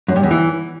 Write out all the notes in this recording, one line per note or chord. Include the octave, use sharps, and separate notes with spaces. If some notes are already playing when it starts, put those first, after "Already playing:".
F#2
G2
E2
E3